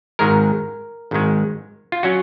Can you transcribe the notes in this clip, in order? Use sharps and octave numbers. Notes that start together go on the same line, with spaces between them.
G#1 G#2 D#3 G#3 A#4
G#1 G#2 D#3 G#3
F4
F#3 C#4 F#4